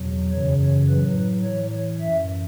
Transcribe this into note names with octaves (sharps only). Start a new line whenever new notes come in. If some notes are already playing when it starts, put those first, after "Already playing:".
Already playing: E2 B2 F#3
F#2 C#3 E3 C#5
A2 F#3 B4
A2 E3 C#5
F#2 E3 E5